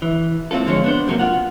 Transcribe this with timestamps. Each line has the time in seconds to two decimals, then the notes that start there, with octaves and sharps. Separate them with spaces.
0.02 E3
0.51 A2 C4 C#4 F4 A4
0.66 G2 D3 F3 G#3 C#5
0.84 B3 D4 C5
1.07 D2 C3 F#3 A3 A#3
1.19 F4 F#5